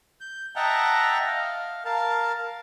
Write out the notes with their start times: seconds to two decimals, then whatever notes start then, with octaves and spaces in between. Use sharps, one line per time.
0.21 G6
0.56 D#5 E5 F#5 G5 A5 A#5
1.27 F5
1.85 A#4 F5 A5